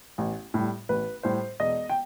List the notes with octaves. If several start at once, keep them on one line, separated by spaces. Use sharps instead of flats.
A1
A2 G3
A1 B4
A2 G3 C5
E1 D#5
G5